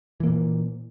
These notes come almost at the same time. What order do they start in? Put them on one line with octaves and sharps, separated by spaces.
E3 A#3 A#2